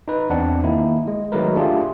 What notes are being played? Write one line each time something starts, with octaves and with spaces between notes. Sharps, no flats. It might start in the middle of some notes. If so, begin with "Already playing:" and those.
D#4 B4
E2 C4 D4 F#5
D#3 A#3 D#4 E4
G#3
D#3 F#3 G#3 A3 A#4 B4
A3 D4 F4 G4 G#4